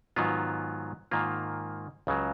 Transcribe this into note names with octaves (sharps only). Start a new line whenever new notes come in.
G#2 D#3 F#3 B3 F4
G#2 D#3 A#3 F4
C#2 C#3 F#3